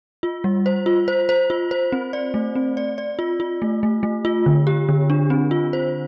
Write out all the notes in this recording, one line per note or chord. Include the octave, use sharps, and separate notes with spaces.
F4
G3
C5
F4
C5
C5
F4
C5
C4
D5
A3
C4
D5
D5
F4
F4
A3
A3
A3
F4
D3
G4
D3
D4
C4
F4
C5